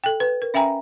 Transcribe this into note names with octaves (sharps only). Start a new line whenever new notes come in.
A4 G5
B4
A#4
C#4 E5 G5 G#5 A#5